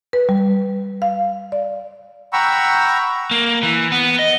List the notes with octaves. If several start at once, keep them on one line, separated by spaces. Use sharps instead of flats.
B4
G3
F5
D5
F#5 G5 A#5 B5 C#6 E6
A#3
E3
B3
D#5